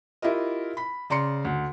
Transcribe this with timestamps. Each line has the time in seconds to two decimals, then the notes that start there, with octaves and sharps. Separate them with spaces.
0.22 E4 F4 G4 A#4 D#5
0.77 B5 B6
1.10 C#3 D5 A#5 C6 C#7
1.45 D2